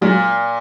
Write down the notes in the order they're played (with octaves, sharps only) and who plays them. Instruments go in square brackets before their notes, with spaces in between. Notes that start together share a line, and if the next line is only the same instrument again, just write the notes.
[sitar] A#2 [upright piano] F#3 G#3